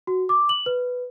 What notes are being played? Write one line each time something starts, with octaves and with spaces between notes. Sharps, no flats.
F#4
D6
F#7
B4